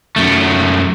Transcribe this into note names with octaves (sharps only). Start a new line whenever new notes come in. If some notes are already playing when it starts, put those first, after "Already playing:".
F#2 A3